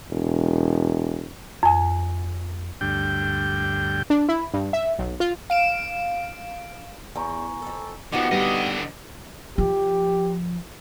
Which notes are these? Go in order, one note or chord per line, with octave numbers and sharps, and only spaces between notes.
E1
F2 G#5
D2 G2 G5
D4
E4
G2
E5
B1
F4
F5 D7 E7
E2 G#5 A#5 C#6
F2 A4
F3 B3 D#4 F#4 G4 D6 C#7
D3 G3 B3 C4 B4 D#5
F3 G4